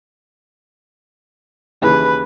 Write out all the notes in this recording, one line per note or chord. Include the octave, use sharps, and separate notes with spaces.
D#2 C#3 E3 B4